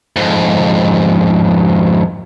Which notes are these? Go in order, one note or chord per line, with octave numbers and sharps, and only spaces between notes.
F2 G#2